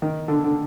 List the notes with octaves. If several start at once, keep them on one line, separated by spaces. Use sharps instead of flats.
D#3
D3
D3